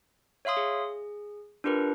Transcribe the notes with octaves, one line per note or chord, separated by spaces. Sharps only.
C#5 E5 F5 C6 D#6
G#4
D4 F4 G4 A#4 B4